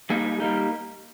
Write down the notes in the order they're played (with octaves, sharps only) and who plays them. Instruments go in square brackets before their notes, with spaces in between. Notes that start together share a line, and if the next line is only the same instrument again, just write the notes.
[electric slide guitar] G2 G3 A#3 D#4 G#4
G3 A#3 D#4